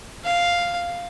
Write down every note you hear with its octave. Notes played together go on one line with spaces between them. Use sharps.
F5